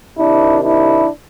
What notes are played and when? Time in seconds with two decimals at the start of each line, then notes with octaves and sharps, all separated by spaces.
0.17 C3 D#3 D4 E4
0.61 D4 E4